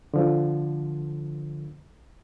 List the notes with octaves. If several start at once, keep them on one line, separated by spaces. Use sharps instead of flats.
D3 F3